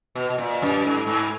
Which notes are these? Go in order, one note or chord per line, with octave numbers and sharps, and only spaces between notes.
B2
B2
A#2
F#2
G#2
G#2